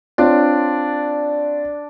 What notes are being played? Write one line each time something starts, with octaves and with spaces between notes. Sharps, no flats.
C4 D4 F4 C#5